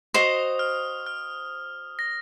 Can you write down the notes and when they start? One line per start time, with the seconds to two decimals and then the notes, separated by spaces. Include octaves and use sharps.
0.14 F#4 C5 D#5 D#6
0.59 F6
1.06 F6
1.99 A#6